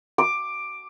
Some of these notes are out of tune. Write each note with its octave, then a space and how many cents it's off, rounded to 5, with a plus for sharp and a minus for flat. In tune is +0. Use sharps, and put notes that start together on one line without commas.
D6 +10